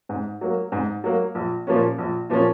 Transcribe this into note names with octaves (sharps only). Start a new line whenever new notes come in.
G#2
F#3 A#3
G#2
F#3 A#3
A#1
A#2 F3 A#3 C#4
A#1
A#2 F3 A#3 C#4